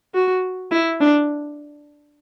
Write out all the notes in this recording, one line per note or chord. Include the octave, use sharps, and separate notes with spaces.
F#4
E4
D4